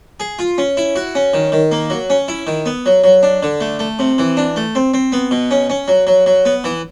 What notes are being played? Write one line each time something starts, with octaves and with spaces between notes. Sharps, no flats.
G#4
F4
C#4
E4
F#4
C#4
D#3
D#3
A#3
F#3
C#4
E4
D#3
B3
F#3
F#3
D4
D3
A3
A3
C3
E3
D4
A3
C4
C4
B3
B2
C#4
C#4
F#3
F#3
F#3
B3
E3